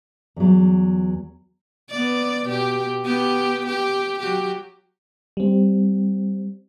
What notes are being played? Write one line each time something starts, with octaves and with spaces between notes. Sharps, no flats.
E2 F#3
B3 D5
B2 G4
B3 G4
G4
F#3 F#4 G4
G3 C4